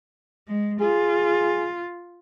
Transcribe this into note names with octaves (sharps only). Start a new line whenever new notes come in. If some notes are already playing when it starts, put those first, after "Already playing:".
G#3
F4 G#4